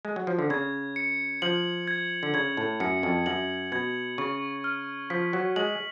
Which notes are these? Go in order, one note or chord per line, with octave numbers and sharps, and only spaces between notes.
G#3
F#3
F3
D3
C#3 G#6
C#7
F3 F#7
G#6
D3
C#3 G#6
A2
F#2 C#7
F2
F#2 F#7
B2 G#6
C#3 C#6
F6
F3 B6
F#3
G#3 F#7